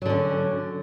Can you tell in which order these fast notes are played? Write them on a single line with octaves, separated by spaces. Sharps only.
F#3 D3 C#4